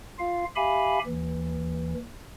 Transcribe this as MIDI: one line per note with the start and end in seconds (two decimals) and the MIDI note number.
0.19 0.45 65
0.19 0.45 77
0.56 0.99 67
0.56 0.99 76
0.56 0.99 77
0.56 0.99 80
0.56 0.99 83
1.07 1.94 39
1.07 1.94 52